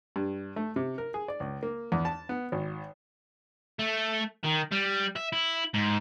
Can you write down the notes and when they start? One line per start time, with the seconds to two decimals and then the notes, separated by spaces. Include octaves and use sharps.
0.16 G2
0.56 A3
0.76 C3
0.98 A#4
1.14 G#4
1.28 D5
1.40 C#2
1.63 A#3
1.92 E2
2.05 A5
2.29 B3
2.52 G#1
3.79 A3
4.44 D#3
4.72 G3
5.16 E5
5.33 E4
5.74 G#2